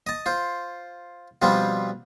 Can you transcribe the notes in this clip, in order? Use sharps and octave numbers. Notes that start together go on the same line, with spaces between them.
D#5 A5
F4 C5
B2 F3 G3 C4 D4 F4